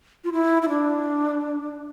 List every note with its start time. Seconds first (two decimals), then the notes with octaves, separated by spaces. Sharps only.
0.24 F4
0.33 E4
0.62 E4
0.69 D4